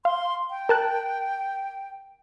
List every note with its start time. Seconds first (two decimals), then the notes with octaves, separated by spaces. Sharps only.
0.05 F5 C6
0.50 G5
0.69 A#4 A5 F#6